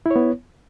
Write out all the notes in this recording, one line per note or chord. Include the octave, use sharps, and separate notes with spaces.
B3 E4 C#5